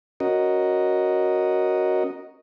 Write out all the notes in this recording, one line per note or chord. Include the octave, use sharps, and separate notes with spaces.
C#4 F#4 A#4 D#5